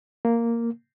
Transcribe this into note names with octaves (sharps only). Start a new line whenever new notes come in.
A#3